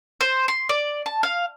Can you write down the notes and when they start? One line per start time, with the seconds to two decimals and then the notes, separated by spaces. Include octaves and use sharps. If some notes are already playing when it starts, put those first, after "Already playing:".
0.21 C5
0.48 C6
0.69 D5
1.06 A5
1.23 F5